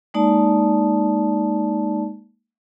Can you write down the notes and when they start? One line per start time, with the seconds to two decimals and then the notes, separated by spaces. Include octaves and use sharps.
0.14 G#3 A#3 D#4 D5 A5